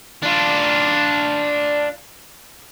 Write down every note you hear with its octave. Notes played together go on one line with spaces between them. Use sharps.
D4 F4